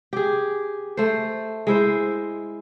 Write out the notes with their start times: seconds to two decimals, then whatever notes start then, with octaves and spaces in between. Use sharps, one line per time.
0.13 G4 G#4
0.97 A3 C5
1.67 G#3 E4 C5